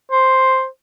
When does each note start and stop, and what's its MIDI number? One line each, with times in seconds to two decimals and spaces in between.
0.12 0.67 72